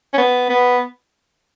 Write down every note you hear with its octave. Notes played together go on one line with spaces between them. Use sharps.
C#4
B3
B3